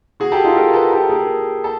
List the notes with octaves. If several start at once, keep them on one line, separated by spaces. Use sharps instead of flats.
F#4 G#4
G4 A4
D#4 F4
G#4 A#4
A4 B4
G4 A4
G#4 A#4
A4